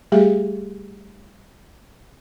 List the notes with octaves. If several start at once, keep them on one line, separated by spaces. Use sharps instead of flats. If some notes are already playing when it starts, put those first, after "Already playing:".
G3 A3 G4 G#4 E5